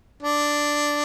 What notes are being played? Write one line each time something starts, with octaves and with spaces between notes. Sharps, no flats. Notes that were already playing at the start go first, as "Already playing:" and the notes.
D4